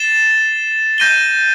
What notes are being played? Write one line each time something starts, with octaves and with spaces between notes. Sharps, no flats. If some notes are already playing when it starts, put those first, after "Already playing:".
Already playing: A6 C7 E7 G7
G6 A#6 D#7 G7